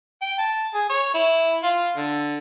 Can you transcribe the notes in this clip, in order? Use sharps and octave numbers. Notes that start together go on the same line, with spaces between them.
G5
A5
G#4
C#5
E4
F4
D3